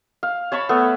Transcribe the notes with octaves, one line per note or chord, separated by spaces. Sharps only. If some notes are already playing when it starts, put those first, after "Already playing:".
F5
C#5 A5 B5 C#6
A3 B3 A4